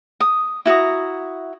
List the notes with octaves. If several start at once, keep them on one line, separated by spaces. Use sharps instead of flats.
D#6
E4 F#4 A#5 D#6